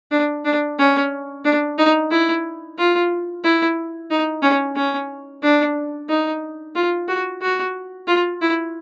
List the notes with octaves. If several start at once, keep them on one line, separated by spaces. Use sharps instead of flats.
D4
D4
C#4
D4
D#4
E4
F4
E4
D#4
C#4
C#4
D4
D#4
F4
F#4
F#4
F4
E4